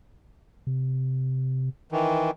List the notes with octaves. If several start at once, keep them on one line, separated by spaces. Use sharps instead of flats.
C3
D#3 E3